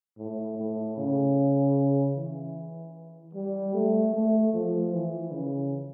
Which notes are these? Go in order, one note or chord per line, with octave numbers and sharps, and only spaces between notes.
A2
A2
C#3
E3
G3
A3
A3
F3
E3
C#3